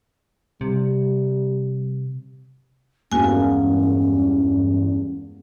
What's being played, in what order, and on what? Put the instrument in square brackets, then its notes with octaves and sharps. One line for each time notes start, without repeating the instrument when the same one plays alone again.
[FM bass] C3 [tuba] G3
[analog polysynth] E2 G2 [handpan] G#3 A#3 B3 [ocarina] C#4 [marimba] F#4 G#5